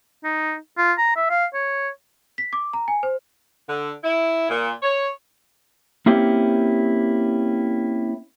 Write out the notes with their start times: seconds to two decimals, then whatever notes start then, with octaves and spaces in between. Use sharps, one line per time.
0.24 D#4
0.78 F4
0.98 A#5
1.16 E5
1.30 F5
1.54 C#5
2.38 B6
2.53 D6
2.73 A#5
2.88 G#5
3.03 C5
3.69 D3
4.04 E4
4.50 A#2
4.82 C#5
6.06 A#3 C4 C#4 E4 G4